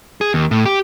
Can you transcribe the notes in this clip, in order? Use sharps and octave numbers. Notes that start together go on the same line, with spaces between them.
G#4
D#2
A2
G4